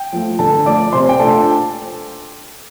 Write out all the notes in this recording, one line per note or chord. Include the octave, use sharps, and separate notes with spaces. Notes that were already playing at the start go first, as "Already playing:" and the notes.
Already playing: G5
F3 A3
D3 A4 A5
F3 A3 D5 D6
C3 C5 C6
G5
A3 D4 F4 A4 A5